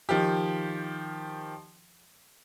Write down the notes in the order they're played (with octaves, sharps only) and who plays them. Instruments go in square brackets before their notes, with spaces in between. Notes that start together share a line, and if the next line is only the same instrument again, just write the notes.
[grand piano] D#3 F3 G4